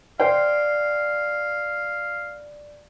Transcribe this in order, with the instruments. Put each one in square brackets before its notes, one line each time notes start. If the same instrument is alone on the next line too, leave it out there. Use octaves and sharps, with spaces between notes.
[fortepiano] C5 G5 [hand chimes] D5 [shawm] F5